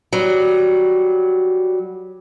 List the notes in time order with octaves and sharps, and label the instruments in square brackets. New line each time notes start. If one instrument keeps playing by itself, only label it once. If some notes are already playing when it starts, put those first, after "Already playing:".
[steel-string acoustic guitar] F#3 G3